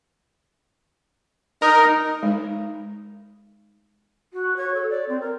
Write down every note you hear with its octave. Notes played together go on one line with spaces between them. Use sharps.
D#4 A#4 D#5
G#3 D#4
F#4
C#5
A4
D5
C4
A#4